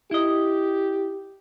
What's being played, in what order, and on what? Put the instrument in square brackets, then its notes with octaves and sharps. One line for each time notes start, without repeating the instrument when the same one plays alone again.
[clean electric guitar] E4 D#5 [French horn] G4